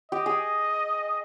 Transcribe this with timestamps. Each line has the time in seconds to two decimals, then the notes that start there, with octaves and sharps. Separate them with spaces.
0.12 G4 D#5
0.26 G#4